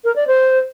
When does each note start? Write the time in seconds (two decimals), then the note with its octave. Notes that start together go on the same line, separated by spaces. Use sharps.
0.04 A#4
0.16 D5
0.27 C5